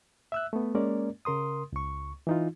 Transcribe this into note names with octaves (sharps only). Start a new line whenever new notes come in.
E5 E6 F#6
A3 B3
G#3 A#3 C#4 A#4 D5
C#3 A#4 C6 D#6
C#2 C#6
E3 D#4 F4